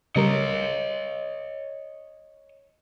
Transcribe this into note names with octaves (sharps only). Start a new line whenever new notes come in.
C#3 G3 A#4 C#5 D#5